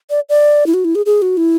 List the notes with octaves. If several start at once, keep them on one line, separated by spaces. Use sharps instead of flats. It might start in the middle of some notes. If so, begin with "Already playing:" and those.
D5
D5
E4
F#4
E4
G#4
G#4
F#4
E4